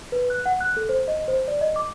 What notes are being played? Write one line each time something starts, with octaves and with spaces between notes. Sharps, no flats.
B4
F#6
F#5
F#6
A4
C5
D#5
C5
D5
D#5
D6